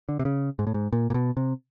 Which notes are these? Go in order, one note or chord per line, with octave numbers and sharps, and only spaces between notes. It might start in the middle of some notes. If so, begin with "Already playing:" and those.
D3
C3
C#3
G#2
A2
G#2
A#2
A#2
B2
C3